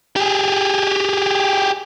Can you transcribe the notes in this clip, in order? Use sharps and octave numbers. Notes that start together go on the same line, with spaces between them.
G4 G#4